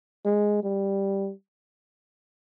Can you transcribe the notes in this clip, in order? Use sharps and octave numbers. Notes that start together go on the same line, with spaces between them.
G#3
G3